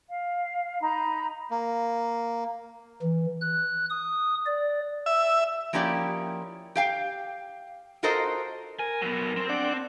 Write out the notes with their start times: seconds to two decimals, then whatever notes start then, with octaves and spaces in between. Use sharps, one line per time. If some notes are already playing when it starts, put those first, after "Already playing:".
0.10 F5
0.81 D#4 A#5 B5
1.51 A#3
3.02 E3
3.41 F#6
3.90 D#6
4.46 D5
5.06 E5
5.73 F3 A#3 C#4 E4 G4 D5
6.75 G4 F5 G5
8.03 F4 F#4 A4 A#4 C5 D#5
8.79 A#4 G#5
9.02 F#3 B3
9.37 C4
9.49 D4 D5 F#5